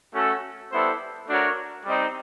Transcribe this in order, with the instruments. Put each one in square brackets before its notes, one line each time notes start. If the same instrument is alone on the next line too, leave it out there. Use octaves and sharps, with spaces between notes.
[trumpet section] A3 C#4 F#4 A4
G3 B3 E4 A4 C5
A3 D4 F#4 A#4 C#5
G3 C4 D#4